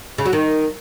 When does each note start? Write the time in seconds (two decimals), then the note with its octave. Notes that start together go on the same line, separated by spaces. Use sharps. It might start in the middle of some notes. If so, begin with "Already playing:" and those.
0.18 C#3
0.26 F#3
0.33 D#3